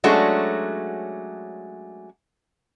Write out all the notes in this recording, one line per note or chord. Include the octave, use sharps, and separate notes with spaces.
F#3 G#3 A3 C#4 D4 F#4